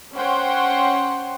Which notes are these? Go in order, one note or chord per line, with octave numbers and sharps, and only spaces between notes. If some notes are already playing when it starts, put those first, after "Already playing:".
C#4 C5 F#5 G5 C6